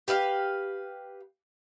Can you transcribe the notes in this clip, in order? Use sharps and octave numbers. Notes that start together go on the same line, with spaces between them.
G4 B4 E5 F5